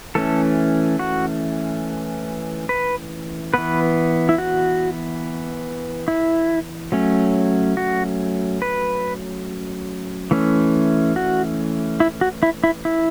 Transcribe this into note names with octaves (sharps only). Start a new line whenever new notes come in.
E3 A3 C#4 A4
F#4
B4
E3 B3 B4
E4
F#4
E4
F#3 A3 C#4
F#4
B4
E3 A3 C#4
F#4
E4
F#4
E4
E4
E4